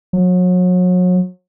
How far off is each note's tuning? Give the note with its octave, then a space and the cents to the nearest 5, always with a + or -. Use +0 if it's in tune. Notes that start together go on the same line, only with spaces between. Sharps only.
F#3 -35